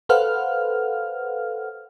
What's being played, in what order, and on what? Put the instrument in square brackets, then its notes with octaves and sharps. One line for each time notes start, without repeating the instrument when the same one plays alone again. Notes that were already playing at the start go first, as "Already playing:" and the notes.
[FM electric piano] A4 B4 C5 F5 F#5 F6